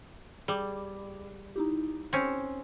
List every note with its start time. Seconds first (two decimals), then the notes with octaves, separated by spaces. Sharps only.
0.48 G3 G#4 D6
1.56 D#4 E4 G4
2.13 C4 C#4